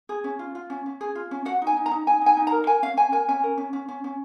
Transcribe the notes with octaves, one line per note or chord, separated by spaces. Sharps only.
G#4
C#4
F4
F4
C#4
C#4
G#4
F4
C#4
F#4 F#5
D#4
G#5
D#4
A#5
D#4
D#4 G#5
D#4 G#5
D#4
A#5
A#4
A#4 G#5
C#4 F5
C#4 G#5
A#4 G#5
C#4 G#5
A#4
C#4
C#4
C#4
C#4